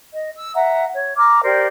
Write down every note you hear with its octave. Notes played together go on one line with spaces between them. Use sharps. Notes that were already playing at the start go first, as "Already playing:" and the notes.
D#5
E6
E5 F#5 A#5
C#5
A#5 D6 F6
G4 A#4 C5 D5